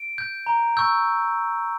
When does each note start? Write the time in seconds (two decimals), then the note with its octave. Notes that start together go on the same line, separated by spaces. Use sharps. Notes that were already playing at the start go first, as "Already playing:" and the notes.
Already playing: D7
0.18 G6
0.46 A#5
0.77 C#6 E6 G6